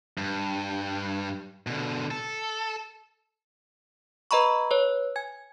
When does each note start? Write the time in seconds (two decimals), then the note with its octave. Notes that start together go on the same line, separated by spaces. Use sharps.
0.18 G2
1.67 B2 D3
2.11 A4
4.31 B4 D#5 A#5 B5 C#6
4.71 B4 C#5
5.16 G#5 G#6